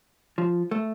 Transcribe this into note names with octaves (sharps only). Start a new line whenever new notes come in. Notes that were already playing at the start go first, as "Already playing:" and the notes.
F3
A3